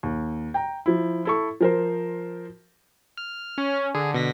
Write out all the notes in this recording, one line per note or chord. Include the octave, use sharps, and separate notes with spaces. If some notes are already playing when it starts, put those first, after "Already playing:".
D#2
G5 A#5
F3 E4
E4 A4 C#6
F3 A#4 C5
F6
C#4
D3 G#4
B2 A#6 B6